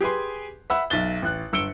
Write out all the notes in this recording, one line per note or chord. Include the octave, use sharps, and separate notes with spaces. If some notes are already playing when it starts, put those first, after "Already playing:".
G4 G#4 B4 G#5 C6
E5 F#5 B5 E6
B1 E5 A6 G7
A1 F#6
G1 E6 C#7 D7 G7